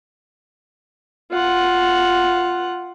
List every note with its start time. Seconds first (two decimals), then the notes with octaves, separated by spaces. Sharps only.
1.31 F4 F#5